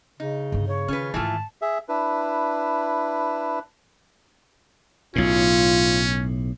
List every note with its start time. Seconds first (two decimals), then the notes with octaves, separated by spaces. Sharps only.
0.20 C#3 D#4
0.52 G2 B3
0.67 C#3 C#5
0.88 D#3 C#4 F4 B4
1.14 G#2 D#3 E3 A3 F4 A5
1.62 G#4 E5
1.89 D4 E4 B4
5.16 B1 A2 C#4 F4